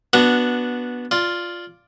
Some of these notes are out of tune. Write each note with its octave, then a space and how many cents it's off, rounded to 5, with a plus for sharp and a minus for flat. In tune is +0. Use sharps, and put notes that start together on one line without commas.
B3 -15 D4 -5 F#4 +0
F4 +0 D5 +0